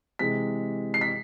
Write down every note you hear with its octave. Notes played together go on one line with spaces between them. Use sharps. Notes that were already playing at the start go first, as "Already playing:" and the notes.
C3 E3 G#3 B6
C7
B6